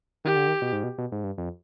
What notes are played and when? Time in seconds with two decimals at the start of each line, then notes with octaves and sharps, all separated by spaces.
0.25 D#3 G4
0.36 D3
0.48 D#3
0.62 B2
0.73 G#2
0.84 B2
0.98 B2
1.12 G#2
1.24 G2
1.38 F2